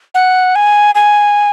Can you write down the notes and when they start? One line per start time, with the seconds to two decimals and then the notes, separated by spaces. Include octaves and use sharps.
0.15 F#5
0.55 G#5
0.95 G#5